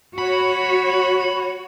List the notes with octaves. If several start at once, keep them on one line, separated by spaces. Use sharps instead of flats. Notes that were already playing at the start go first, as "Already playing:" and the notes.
F#4 C#5 B5